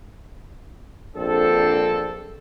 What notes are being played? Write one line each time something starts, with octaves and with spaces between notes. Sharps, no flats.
A#1 F2 C4 D4 A4